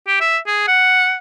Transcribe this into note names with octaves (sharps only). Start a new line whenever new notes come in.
G4
E5
G#4
F#5